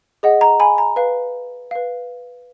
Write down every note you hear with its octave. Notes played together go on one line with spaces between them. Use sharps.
G#4 D#5 F#5
A#5
G#5 B5
A#5
B4 F5
B4 F5